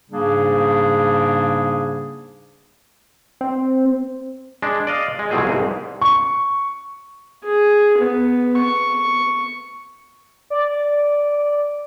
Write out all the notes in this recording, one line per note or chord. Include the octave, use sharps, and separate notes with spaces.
G#2 C#3 G3 A#3 D4 G#4
C4
G#3 D4
D5 D#5 F5
G#3
C2 F2 B2 C4 G#4
C2 G#2
C#6
G#4
B3
C#6
D5